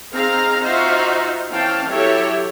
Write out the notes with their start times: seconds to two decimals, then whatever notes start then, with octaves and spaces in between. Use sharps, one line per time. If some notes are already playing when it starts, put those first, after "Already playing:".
0.12 C4 D#4 G#4 F5 A#5
0.62 D#4 F4 F#4 C5 E5 F5
1.50 E3 C4 C#4 F5 G5 A5
1.88 F#3 E4 G4 A4 C#5 E5